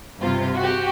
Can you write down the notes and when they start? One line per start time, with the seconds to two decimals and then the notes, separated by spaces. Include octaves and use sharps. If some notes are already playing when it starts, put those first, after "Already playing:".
0.20 G2 C3 F4
0.56 F#4 G4